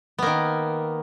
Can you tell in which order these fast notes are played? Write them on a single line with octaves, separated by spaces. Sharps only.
B3 A#3 D#3